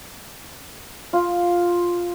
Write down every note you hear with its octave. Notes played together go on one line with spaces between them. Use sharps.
F4